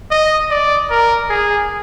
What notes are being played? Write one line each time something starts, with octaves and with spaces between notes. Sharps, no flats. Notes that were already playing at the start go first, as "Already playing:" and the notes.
D#5
D5
A#4
G#4